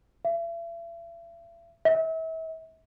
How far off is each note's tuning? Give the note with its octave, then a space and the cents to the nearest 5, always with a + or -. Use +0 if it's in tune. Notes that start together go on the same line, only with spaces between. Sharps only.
E5 +40
E5 -35